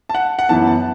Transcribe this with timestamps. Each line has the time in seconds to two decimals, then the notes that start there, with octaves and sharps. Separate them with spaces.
0.09 A5
0.15 F#5
0.39 F#5
0.49 F#2 E3 B3 A5
0.67 A5